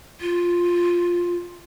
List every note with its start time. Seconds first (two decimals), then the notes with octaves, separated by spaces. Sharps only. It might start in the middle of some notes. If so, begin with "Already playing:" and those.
0.21 F4